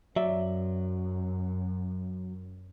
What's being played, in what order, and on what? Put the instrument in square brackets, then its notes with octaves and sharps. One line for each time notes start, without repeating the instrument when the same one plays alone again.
[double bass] F#2 [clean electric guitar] F#3 [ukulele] D5 E5